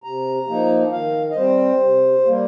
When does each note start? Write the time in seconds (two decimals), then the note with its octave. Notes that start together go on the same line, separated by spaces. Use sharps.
0.03 C3 A#5
0.48 F3 A#3 D#4
0.92 D#3 F5
1.31 D#5
1.36 G3 C4 C5
1.80 C3
2.25 G3 A#3